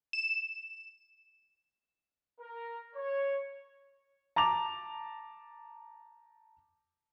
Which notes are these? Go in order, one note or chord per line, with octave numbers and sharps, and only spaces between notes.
E7
A#4
C#5
A5 A#5 D6 F7